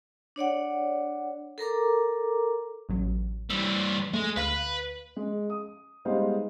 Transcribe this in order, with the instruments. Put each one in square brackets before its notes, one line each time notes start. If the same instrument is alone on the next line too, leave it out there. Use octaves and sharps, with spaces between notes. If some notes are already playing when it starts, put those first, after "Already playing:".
[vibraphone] D4 C#5 D5 F#5
A4 A#4 A#5 D6
[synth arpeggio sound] A1 F#3
[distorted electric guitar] E3 G3 [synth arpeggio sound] E6
[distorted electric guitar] G#3 [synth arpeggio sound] A3
[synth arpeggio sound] D2 F5 B5 [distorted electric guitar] B4
[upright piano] G#3
D#6
G3 G#3 B3 D#4 C5 F5